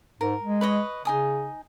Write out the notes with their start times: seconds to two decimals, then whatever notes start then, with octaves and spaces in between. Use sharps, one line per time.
0.21 G#2 A#4
0.43 G#3
0.61 B4 C#5 D#5
1.05 C#3 D#4 G#5 D#6